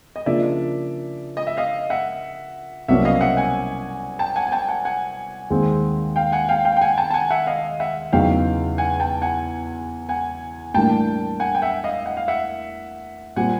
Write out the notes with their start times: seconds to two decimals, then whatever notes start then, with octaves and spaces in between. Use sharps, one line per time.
0.16 D#5
0.26 C#3 F3 A#3 D4 D5 E5
1.37 D#5
1.47 E5
1.57 D#5 F5
1.90 E5 F#5
2.88 C2 B2 F#3 A#3 C#4 E5 F#5
3.05 D#5 F5
3.21 E5 F#5
3.37 F#5 G#5
4.19 G5 A5
4.36 F#5 G#5
4.47 G#5
4.52 G5 A5
4.68 F#5 G#5
4.85 F#5 G#5
5.50 D#2 D#3 G#3 C4
6.16 F5 G5
6.32 F#5 G#5
6.49 F5 G5
6.65 F5 G5
6.76 G5
6.81 F#5 G#5
6.98 G5 A5
7.10 A5
7.14 F#5 G#5
7.30 E5 F#5
7.47 D#5 F5
7.80 E5 F#5
8.12 E2 C#3 F#3 B3 D#4 F5 G5
8.78 F#5 G#5
9.00 G5 A5
9.22 F#5 G#5
10.09 F#5 G#5
10.74 A2 E3 G3 A#3 D4 G5 A5
11.40 F#5 G#5
11.55 G5
11.62 E5 F#5
11.84 D#5 F5
12.06 F#5
12.17 F5
12.28 E5 F#5
13.36 A#2 G3 C4 F#5 G#5